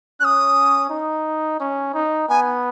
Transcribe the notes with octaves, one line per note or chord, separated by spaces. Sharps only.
C#4 D#6 F#6
D#4
C#4
D#4
B3 G#5